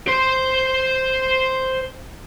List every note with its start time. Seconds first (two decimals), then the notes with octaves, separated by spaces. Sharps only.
0.08 C5 C6